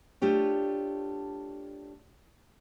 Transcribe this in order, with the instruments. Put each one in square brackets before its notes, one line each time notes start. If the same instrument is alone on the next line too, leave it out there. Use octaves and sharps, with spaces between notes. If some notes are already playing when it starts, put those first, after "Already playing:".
[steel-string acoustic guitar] A3 D4 F4 G4 C#5